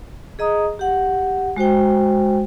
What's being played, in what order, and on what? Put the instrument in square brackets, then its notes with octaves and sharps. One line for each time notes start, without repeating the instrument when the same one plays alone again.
[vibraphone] G#4 D#5 A#5 D#6
G4 F#5
G#3 F#4 C5 G5